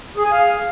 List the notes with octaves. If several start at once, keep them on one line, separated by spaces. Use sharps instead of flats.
G#4
G#5
F5